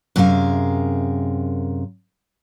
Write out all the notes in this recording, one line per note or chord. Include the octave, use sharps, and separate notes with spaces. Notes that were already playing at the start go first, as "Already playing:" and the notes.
F#2 C3 G#4 A#4 F5